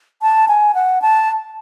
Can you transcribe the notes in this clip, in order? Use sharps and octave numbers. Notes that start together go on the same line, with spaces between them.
A5
G#5
F#5
A5